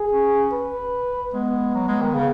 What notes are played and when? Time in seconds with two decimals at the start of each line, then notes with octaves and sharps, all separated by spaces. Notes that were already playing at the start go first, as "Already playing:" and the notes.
Already playing: G#4
0.12 C#4
0.52 B4
1.34 G#3 B3
1.75 F#3
1.88 G#3
2.01 D#3
2.15 C#3